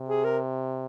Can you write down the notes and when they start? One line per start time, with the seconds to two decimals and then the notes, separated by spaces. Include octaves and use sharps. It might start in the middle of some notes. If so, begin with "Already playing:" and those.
Already playing: C3
0.09 G#4
0.24 A#4